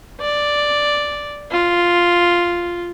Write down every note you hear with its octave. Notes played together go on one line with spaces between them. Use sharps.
D5
F4